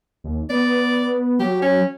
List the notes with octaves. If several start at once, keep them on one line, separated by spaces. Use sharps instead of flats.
D#2
B3 D5
F#3 G4
C#4